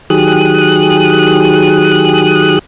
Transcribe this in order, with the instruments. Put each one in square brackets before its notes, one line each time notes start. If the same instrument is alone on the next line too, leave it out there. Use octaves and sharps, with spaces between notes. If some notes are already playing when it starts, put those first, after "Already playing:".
[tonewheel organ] D#3 F#3 G4 G#4 D#6 F#6